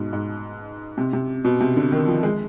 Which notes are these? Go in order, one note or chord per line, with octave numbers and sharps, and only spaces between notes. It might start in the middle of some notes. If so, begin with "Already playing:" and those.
Already playing: G#2 B2
G#2
C3
C3
B2
C3
D3
D#3
F3
G#3